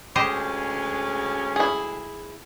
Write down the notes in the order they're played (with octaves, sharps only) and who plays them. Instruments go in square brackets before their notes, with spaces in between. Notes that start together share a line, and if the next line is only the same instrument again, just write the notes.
[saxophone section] D2 G#3 [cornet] C#4 [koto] G4 C5 D#5
[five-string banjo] E4 G#4